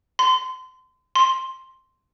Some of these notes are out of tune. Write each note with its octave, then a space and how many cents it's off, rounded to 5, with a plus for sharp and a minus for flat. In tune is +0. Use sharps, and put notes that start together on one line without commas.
C6 -30
C6 +5